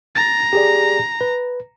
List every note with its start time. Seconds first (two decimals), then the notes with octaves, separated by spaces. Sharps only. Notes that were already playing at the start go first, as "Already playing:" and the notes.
0.15 A#5 A6
0.53 G4 G#4 D5
1.21 B4